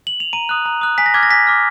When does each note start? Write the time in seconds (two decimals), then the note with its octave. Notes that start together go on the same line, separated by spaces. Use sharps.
0.07 F#7
0.20 F7
0.33 A#5 D#7
0.49 D#6 F#6
0.66 A#5
0.81 D#6 F#6
0.98 G#5 B6
1.06 A#6
1.14 D6 F6 G#6
1.23 A#6
1.30 G#5 B6
1.47 D6 F6